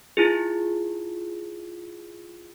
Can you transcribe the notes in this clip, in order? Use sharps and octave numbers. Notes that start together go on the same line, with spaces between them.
E4 F4 G#4